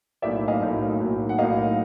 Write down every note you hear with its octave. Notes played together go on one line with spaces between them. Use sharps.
B1 A2 F#3 A#3 D5 E5
D#5 F5
B1 A2 F#3 A#3
B1 A2 F#3 A#3
F#5
B1 A2 F#3 A#3 D#5 F5